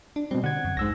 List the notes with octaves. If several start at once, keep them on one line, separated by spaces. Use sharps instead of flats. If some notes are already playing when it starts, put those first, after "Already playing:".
D4
B2 G3 C4
D3 F#5 G#6
F#2
C2 G#2 E6 A#6